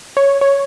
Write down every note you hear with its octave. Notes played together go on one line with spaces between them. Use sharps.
C#5
C#5